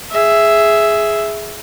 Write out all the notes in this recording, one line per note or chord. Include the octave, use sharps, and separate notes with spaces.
G#4 E5